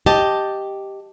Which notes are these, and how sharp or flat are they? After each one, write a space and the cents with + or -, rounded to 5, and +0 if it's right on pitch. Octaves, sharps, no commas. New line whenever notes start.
G4 +0 D#5 +0 A5 +0